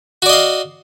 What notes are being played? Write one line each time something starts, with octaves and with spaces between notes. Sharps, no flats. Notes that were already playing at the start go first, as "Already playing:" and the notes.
F#4 D5 D#5 F5